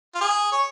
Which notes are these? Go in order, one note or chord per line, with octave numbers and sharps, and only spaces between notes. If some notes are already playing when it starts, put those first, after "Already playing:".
F4
G#4
C#5